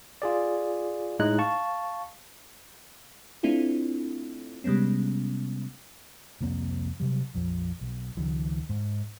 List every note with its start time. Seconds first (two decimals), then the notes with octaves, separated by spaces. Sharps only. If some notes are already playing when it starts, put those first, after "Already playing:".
0.22 F4 G#4 D5
1.19 A2 G#3 D#4 F#6
1.38 F5 A5 C#6
3.43 A3 C4 D4 E4 F4 A4
4.64 C3 G3 G#3 B3 C#4
6.41 C2 F2 A#3 C4
7.00 C3 F#3 G3
7.34 A#1 F2 F3
7.81 B1
8.17 C#2 D#3 F3
8.69 G#2